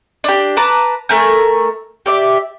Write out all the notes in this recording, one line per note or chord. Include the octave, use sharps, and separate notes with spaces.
D4 G4
B4 A5 A#5 D6
A3 A#4 G#5 G6
G4 D5 E5